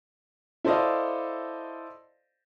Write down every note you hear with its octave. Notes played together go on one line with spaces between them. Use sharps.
E4 A4 C5 D5 D#5 F5